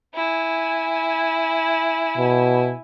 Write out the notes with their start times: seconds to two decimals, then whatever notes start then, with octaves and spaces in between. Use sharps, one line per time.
0.15 E4 G#5
2.17 B2